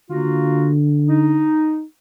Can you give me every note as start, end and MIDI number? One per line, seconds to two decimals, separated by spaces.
0.10 1.49 50
0.10 0.74 58
0.10 0.74 65
0.10 0.74 66
1.09 1.83 63